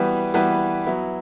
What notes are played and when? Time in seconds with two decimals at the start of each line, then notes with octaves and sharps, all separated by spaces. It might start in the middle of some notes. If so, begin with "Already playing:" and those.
Already playing: E3 G3 B3 F#4 B4
0.34 E3 G3 B3 F#4 B4
0.86 F#3 B3 E4